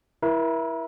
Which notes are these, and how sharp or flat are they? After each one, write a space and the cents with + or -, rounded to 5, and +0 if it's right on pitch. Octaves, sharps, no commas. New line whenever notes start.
E4 +0 A#4 +40